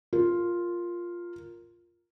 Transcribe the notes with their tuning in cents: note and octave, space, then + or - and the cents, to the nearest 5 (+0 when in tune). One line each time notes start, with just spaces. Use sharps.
F4 +0 A#4 +0